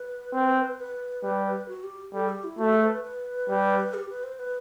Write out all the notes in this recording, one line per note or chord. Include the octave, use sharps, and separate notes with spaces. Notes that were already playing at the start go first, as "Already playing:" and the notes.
Already playing: B4
C4
B4
G3
F#4
G4
G3 A4
G4
E4
A3 F#4
A4
C5
B4
B4
G3
G4
B4
C5
B4